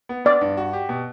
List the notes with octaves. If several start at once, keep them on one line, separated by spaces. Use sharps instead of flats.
B3
B3 D5
G2
F#4
G4
B2